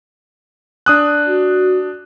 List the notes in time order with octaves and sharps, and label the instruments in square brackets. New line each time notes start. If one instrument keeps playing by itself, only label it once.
[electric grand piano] D4 D#6 F#6
[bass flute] F#4